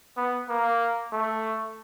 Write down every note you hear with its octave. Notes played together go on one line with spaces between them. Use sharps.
B3
A#3
A3